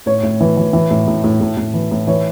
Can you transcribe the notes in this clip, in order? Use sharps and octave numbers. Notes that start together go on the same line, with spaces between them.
A2 C#5
A2
E3
E3
E3
A2
A2
A2
A2
A2
E3
A2
E3 C#5